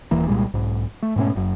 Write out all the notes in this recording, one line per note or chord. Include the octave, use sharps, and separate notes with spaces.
D#1 E3 A#3
C2 A#2 G3 G#3
B1 G#2
A3
G#2 B2 A3 C#4
F#1 F#2